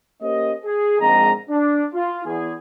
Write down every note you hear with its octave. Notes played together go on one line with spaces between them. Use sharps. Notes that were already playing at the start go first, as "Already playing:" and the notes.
A#3 C#4 G4 C5 D#5
G#4
A#1 G#2 G#3 C4 D#5 A#5
D4
F4
E2 G#4